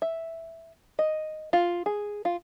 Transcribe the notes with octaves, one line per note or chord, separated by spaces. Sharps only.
E5
D#5
F4
G#4
F4